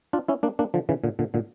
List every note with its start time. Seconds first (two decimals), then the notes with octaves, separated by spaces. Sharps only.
0.13 D4 F4
0.28 C#4 E4
0.43 A#3 D4
0.59 A#3 D4
0.74 D3 F3
0.89 C#3 E3
1.04 A#2 D3
1.19 A#2 D3
1.34 A#2 D3